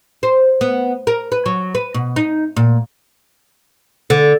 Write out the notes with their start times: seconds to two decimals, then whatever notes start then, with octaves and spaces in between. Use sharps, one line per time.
0.23 C5
0.61 B3
1.07 A#4
1.32 B4
1.46 F#3
1.75 B4
1.94 B2
2.16 D#4
2.56 A#2
4.10 D3